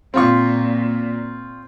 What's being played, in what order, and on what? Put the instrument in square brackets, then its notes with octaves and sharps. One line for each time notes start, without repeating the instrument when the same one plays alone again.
[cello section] A#2 [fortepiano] C4 F4 C#6